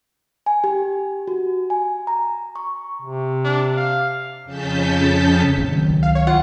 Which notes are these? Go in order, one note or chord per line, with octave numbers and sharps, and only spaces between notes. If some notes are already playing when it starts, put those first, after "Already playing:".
G#5
G4
F#4
G#5
A#5
C#6
C3
D4
F5
F2 C#3 C#4 A5 G6 B6
A1 C#3 A3 C4
D#3 F#3
C#2
F5
C#5
F4 F#5